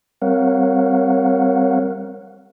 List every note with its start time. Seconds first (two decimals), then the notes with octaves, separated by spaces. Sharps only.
0.22 G3 C4 A#4 C#5 F5 F#5